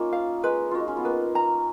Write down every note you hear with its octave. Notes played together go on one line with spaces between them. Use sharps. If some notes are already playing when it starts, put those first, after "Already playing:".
Already playing: A#3 C#4 D#4 F4
F5
G#3 B4
F4 F#4
D#4
C#4
B3
A#3 B4
A#3 A#5